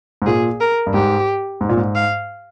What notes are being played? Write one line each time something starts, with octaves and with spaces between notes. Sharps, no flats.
G#2
A#2 G#4
A#4
G2
G#2 G4
G#2
A#2
G#2
F5